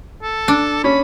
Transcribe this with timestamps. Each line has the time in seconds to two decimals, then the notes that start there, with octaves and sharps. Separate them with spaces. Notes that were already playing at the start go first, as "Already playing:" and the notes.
0.23 A4
0.48 D4
0.84 C#4 B5